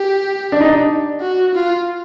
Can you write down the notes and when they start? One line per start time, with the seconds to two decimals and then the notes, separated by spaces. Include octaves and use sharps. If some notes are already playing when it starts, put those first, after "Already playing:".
Already playing: G4
0.52 D4
0.60 D#4
0.69 D4
1.21 F#4
1.55 F4